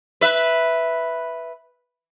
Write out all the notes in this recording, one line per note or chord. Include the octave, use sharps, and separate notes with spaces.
B4 E5